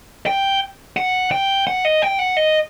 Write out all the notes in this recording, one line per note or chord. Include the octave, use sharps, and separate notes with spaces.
G5
F#5
G5
F#5
D#5
G5
F#5
D#5